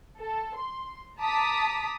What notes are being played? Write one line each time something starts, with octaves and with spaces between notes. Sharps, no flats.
A4
C6
A5 A#5 D6 D#6 B6